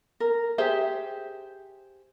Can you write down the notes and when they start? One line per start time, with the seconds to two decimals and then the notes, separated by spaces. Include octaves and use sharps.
0.20 A#4
0.58 G4 G#4 C5 E5